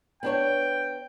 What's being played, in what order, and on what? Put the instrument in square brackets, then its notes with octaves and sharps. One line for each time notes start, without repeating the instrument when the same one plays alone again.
[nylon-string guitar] B3 D4 C#5 [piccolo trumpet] G5